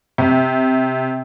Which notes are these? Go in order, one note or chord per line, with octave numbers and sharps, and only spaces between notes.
C3